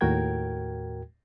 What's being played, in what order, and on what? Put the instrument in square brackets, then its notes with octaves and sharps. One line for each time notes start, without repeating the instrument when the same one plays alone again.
[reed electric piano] D#2 A2 F#4 A#4 G5 G#6